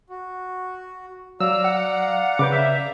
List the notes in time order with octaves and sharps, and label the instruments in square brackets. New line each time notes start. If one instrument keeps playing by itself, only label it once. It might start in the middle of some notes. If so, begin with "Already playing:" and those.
[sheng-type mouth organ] F#4
[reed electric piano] F#3 [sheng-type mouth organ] D5 F5 A#5 [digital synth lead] E6
[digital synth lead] F#5
[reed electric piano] C#3 B4 G6 [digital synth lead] D6
[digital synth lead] E5